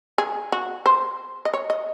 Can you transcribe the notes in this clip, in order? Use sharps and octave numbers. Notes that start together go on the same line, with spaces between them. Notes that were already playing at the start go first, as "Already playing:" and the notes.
G#4
F#4
C5
D#5
C#5
D#5